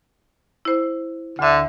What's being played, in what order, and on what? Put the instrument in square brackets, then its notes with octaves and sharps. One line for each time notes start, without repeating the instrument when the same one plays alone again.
[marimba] E4 C5
[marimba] D2 E5 [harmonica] D3